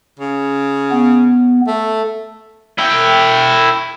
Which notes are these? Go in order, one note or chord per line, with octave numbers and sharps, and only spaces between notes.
C#3
B3
A3
E4 G5